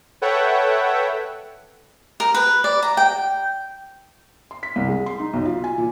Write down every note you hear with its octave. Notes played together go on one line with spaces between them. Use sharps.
A4 B4 C#5 E5 F#5 G5
A#4
B4
D5
A#5
G5
C6
B6
C2
G#3
C6
D#4
B1
F4
G#5
A#2